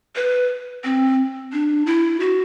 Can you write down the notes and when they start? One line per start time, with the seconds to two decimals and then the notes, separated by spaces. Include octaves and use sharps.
0.16 B4
0.84 C4
1.52 D4
1.86 E4
2.20 F#4